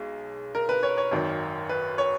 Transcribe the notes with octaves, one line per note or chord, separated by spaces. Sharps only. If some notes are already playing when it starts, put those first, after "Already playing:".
Already playing: B1 G#3
A#4
B4
C#5
C#5
G#1 F#2 D#3
B4
C#5